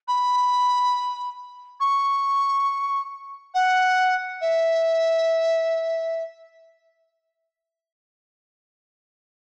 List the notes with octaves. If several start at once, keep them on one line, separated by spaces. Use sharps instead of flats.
B5
C#6
F#5
E5